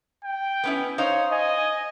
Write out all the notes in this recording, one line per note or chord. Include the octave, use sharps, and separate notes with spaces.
G5
B3 C#4 E4
D#4 C5 C#5 F5
D#5 G#5